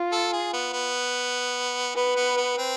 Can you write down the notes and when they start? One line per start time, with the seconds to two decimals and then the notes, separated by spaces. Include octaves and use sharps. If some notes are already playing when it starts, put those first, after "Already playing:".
Already playing: F4
0.12 A4
0.33 G#4
0.53 B3
0.73 B3
1.95 B3 B4
2.16 B3
2.37 B3
2.57 C4